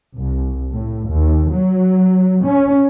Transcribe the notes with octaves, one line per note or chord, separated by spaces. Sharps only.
C2
A2
D#2
F#3
C#4